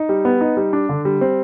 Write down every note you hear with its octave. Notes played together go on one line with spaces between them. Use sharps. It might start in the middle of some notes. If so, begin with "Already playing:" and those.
Already playing: D#4
G3
B3
D#4
G3
D4
D3
G3
C4